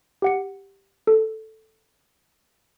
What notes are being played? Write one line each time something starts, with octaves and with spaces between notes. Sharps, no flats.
G4 F#5 C#7
A4